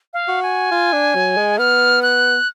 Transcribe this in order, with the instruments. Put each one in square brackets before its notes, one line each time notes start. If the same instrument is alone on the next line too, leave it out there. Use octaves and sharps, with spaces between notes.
[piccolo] F5
[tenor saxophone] F#4
[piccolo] G#5
[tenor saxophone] F4
D4
F#3
G#3
[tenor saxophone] B3 [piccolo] F6
[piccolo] F#6